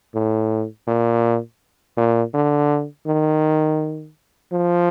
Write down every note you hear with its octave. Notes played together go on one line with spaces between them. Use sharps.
A2
A#2
A#2
D3
D#3
F3